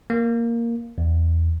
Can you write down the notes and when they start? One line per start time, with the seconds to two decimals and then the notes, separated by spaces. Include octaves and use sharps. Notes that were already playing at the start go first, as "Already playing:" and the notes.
0.10 A#3
0.98 E2